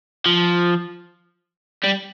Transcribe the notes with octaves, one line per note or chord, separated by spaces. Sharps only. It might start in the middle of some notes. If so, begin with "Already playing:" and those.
F3
G3